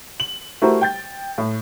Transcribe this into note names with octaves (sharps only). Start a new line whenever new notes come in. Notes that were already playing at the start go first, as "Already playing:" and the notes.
F#7
A3 E4 F#4 G4 A#4 C5
G5 G6 A6
A2